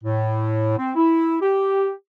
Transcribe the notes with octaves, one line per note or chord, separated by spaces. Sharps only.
A2
C4
E4
G4